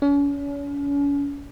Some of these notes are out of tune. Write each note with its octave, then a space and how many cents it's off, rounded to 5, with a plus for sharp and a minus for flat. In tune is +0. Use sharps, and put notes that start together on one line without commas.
C#4 +35